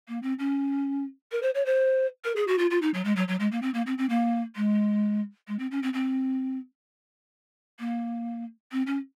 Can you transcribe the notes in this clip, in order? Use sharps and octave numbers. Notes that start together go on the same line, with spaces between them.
A#3
C4
C#4
A#4
C5
C#5
C5
A#4
G#4
F#4
F4
F4
D#4
F#3
G#3
F#3
F#3
G#3
A#3
C4
A#3
C4
C4
A#3
G#3
G#3
C4
C#4
C4
C4
A#3
C4
C#4